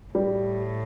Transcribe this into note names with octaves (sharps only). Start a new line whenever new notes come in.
A2 G3